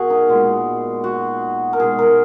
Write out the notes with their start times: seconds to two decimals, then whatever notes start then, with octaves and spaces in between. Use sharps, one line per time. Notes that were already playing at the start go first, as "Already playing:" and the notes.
Already playing: B2 A#3 F#4 G#4 A#4
0.10 D#4
0.29 A#2 G#3 B3
1.04 F#4
1.73 A#4
1.80 B2 G#3 D#4 G#4
1.99 A#4